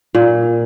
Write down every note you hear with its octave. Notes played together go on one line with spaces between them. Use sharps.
A#2